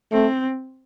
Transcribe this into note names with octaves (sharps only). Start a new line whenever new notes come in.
A3 C4